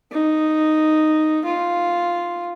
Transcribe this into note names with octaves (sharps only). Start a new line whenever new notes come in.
D#4
F4